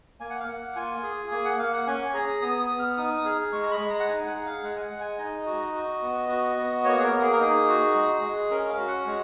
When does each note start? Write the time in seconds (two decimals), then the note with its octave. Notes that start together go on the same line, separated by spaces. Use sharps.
0.20 A#3 G#5
0.30 F#5
0.40 F5
0.48 A#3 F#5
0.76 F4 G#5
1.03 G#4
1.31 A#3 G#5
1.45 F#5
1.59 A#3 F5
1.73 F#5
1.87 C#4 G#5
2.14 G#4 A#5
2.42 B3 D#6
2.60 D#6
2.70 B3
2.79 F6
2.97 D#4 D#6
3.25 G#4 F6
3.53 G#3 C#6
3.63 A#5
3.71 B5
3.80 G#3
3.90 A#5
4.00 F#5
4.08 D#4 G#5
4.26 F#5
4.35 G#4
4.46 F5
4.63 G#3 F#5
4.77 G#5
4.82 F#5
4.91 G#3
5.01 G#5
5.18 D#4 D#5
5.46 F#4
5.74 F#4
6.02 B3
6.29 F#4
6.57 B3
6.85 A#3 C#5
6.99 G#4
7.03 A#4
7.12 A#3
7.22 G#4
7.33 A#4
7.40 D#4 G#4
7.68 F#4
7.95 G#3
8.23 G#3
8.51 C#4 A#4
8.69 F5
8.78 F#4
8.88 F#5
9.07 G#3